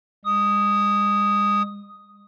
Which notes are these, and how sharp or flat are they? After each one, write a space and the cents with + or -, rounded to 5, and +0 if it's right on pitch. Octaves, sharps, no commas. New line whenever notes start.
G#3 -40 D#6 +0